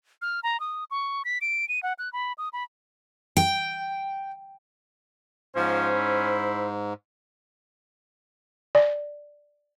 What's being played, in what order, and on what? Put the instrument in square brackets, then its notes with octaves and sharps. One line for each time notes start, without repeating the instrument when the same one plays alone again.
[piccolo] F6
A#5
D#6
C#6
B6
D7
D#7
F#5
F#6
B5
D#6
B5
[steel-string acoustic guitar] G5
[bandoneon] G#2 [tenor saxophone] F3 [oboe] C#4 [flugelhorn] C5
[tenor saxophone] E4
[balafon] D5